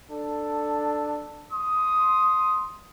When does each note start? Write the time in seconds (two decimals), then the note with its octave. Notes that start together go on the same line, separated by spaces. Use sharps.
0.11 D4 A4
1.53 C6 D#6